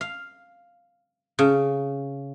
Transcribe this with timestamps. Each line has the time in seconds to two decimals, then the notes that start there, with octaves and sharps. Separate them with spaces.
0.01 F5
1.39 C#3